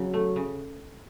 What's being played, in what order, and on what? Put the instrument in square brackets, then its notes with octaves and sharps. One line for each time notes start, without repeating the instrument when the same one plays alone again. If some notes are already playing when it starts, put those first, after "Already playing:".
Already playing: [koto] C#3 [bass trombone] F#3
[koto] A3
C#3